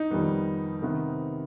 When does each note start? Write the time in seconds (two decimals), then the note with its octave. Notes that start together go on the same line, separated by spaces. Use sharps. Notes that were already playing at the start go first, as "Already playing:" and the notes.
Already playing: D#4
0.10 F2 D#3 G3 B3
0.82 C3 D#3 B3